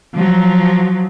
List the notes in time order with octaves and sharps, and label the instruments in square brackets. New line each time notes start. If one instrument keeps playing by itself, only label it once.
[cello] F3 F#3